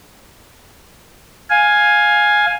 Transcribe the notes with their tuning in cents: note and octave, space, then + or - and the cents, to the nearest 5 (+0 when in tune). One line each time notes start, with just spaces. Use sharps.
F5 +15 G#5 +0